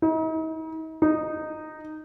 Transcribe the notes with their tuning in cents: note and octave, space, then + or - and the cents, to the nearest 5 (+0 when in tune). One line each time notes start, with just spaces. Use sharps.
D#4 +40
D#4 -10